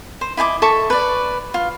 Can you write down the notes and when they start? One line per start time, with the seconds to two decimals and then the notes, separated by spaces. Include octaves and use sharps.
0.21 C5
0.37 E4 D#5 G#5 D6
0.62 A4 E5 C#6
0.90 B4 D5
1.54 F4